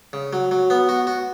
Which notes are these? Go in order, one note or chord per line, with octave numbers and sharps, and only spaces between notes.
C#3
F#3
F#3
B3
F#4
F#4